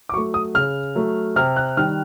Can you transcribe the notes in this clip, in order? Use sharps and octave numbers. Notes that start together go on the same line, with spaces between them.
D6
F#3 A3 C#6
D#6
C#3 F6
F#3 A3
C3 F6
F#6
D#3 G3 F6